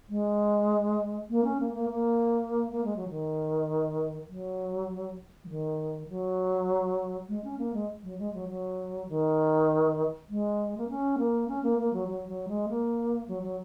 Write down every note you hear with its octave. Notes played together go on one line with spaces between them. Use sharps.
G#3
A#3
C#4
A#3
A#3
A#3
A#3
G#3
F#3
D#3
F#3
F#3
D#3
F#3
G#3
C#4
A#3
G#3
F#3
G#3
F#3
F#3
D#3
G#3
A#3
C#4
A#3
C#4
A#3
A#3
F#3
F#3
F#3
G#3
A#3
F#3
F#3